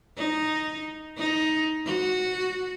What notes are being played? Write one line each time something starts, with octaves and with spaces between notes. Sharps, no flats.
D#4
D#4
F#4